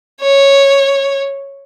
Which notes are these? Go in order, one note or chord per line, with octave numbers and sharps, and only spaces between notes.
C#5